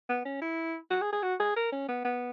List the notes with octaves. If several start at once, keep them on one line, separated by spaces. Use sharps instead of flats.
B3
C#4
E4
F#4
G#4
G#4
F#4
G#4
A#4
C#4
B3
B3